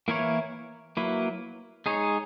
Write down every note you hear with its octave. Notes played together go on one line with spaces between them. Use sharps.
E3 A#3 E4 A#4 C#5
F#3 A#3 E4 B4
G#3 D#4 G#4 C#5